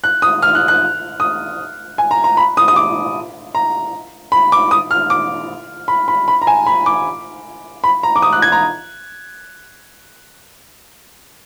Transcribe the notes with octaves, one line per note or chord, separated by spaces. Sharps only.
F#6
D#6
F6
F#6
F#6
D#6
G#5
A#5
A#5
B5
D#6
D#6
D6
A#5
B5
D6
D#6
F6
D6
B5
B5
B5
A#5
G#5
B5
D6
B5
A#5
D6
D#6
F#6
G#6
A#5